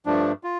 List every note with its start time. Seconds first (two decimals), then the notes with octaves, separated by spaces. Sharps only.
0.06 G2 F3 A3 D4
0.44 F4